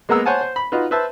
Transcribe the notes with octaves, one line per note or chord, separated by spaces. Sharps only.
G#3 A#3 B3 A#5 E6
C5 C#5 F#5 G#5 A5
C5
B5
D#4 F4 F#4 B4
B4 C5 E5 A5